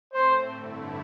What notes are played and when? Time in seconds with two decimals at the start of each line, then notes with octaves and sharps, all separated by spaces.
0.13 A2 A3 C4 C5
0.48 G2 D3 A3 E4